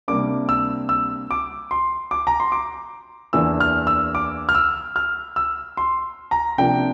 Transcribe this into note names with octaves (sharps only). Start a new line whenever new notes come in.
C3 G3 A#3 D4 D6
E6
E6
D6
C6
D6
A#5
C6
D6
E2 E3 A#3 D4 E6
F6
E6
D6
F6
E6
F6
E6
C6
A#5
C3 F3 A#3 D4 G5